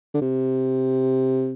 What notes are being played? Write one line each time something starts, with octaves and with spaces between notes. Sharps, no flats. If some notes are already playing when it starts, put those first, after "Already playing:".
D3
C3